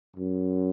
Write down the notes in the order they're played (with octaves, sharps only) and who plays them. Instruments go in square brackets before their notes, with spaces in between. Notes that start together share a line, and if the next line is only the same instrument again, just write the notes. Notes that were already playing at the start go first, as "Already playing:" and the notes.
[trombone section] F#2